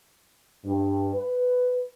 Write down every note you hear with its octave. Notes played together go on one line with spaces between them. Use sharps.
G2
B4